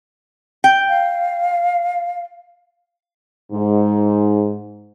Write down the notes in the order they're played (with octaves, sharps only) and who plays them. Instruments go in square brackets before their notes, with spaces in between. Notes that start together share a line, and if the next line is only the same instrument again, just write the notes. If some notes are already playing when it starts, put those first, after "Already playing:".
[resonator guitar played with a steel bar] G5
[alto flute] F5
[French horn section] G#2